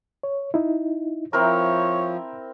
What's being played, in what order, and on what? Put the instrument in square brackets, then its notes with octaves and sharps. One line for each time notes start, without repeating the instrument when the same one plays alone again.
[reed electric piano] C#5
D#4 E4
[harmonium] F3 [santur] C4 E4 A#4 [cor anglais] C#5 [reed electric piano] A#5